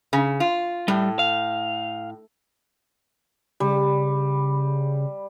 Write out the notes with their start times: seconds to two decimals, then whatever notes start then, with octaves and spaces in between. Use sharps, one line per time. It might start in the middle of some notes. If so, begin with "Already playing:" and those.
0.13 C#3
0.40 F4
0.88 A2 G3
1.19 F5
3.60 C#3 G3